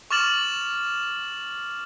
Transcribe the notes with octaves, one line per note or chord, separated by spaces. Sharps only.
C#6 D6 F6 A6 E7 F#7